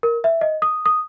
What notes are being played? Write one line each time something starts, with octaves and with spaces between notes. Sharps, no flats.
A#4
E5
D#5
D#6
D#6